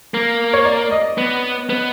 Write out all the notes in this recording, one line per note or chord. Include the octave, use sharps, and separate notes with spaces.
A#3
C#5
D5
D#5
B3
B3